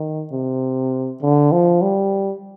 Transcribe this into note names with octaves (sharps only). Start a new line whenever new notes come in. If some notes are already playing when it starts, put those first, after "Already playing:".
Already playing: D#3
C3
D3
F3
G3